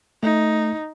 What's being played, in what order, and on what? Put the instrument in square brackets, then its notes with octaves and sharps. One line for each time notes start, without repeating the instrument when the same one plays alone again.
[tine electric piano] A3 [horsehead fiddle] D#4